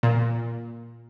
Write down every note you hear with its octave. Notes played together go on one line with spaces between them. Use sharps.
A#2